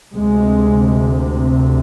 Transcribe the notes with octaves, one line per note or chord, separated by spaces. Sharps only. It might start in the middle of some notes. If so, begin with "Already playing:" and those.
D2 C3 G#3